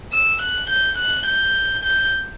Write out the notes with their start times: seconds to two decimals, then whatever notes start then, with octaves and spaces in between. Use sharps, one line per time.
0.12 E6
0.42 F#6
0.70 G6
0.98 F#6
1.26 G6
1.83 G6